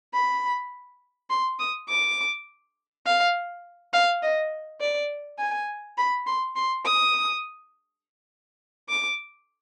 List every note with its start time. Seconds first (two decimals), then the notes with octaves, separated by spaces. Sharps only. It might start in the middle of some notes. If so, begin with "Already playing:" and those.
0.14 B5
1.30 C6
1.60 D#6
1.89 D6
3.06 F5
3.93 F5
4.22 D#5
4.80 D5
5.39 G#5
5.97 B5
6.26 C6
6.56 C6
6.85 D#6
8.89 D6